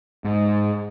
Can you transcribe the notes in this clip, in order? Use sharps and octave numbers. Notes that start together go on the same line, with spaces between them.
G#2